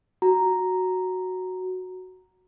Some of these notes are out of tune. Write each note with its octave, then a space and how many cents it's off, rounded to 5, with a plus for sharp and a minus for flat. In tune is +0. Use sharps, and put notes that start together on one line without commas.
F#4 +0 A#5 +0